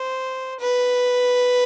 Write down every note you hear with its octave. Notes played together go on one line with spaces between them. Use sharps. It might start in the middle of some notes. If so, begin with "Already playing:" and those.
Already playing: C5
B4